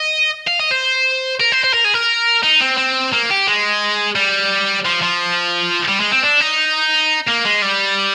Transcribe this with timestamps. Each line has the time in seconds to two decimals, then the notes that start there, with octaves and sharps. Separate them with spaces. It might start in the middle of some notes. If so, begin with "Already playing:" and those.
Already playing: D#5
0.48 F5
0.60 D#5
0.71 C5
1.40 A#4
1.52 C5
1.64 C5
1.74 A#4
1.85 G#4
1.94 A#4
2.44 D#4
2.61 C4
2.78 C4
3.13 A#3
3.30 G4
3.47 G#3
4.16 G3
4.86 F3
5.03 F3
5.88 G3
6.00 G#3
6.12 C4
6.23 D4
6.41 D#4
7.27 A#3
7.45 G#3
7.62 G3